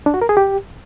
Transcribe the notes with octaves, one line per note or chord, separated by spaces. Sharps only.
D4
F#4
A#4
G#4
G4